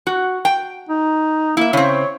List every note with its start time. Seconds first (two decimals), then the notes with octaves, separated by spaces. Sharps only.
0.07 F#4
0.45 G5
0.90 D#4
1.57 A#3 E4 E5
1.73 C#3 C4 C#5